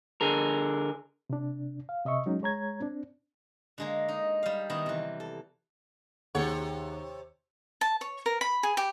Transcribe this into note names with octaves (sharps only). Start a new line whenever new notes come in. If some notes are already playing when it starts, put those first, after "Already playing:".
D3 G#4 A#4
C3 D4
F5
C3 D#5 E5 C#6
F#3 G#3 C#4 D#4
G#3 C#5 A#5 G#6
C4 D4
D3 G#3 A#3
D#4
G3 F5
D#3 B3 E4 D#5
C3 E3
A4
D#2 C3 G#4 C#5 F#5
A5
C#5
A#4
B5
G#4
G4